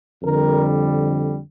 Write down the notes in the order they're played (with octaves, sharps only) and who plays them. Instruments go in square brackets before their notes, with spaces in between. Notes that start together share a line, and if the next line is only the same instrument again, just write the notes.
[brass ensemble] F2 D3 G3 A#4